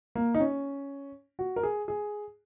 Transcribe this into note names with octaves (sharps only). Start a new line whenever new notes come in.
A#3
D#4
C#4
F#4
A#4
G#4
G#4